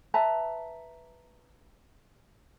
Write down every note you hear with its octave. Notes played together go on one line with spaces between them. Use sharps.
B4 E5 A5 A#5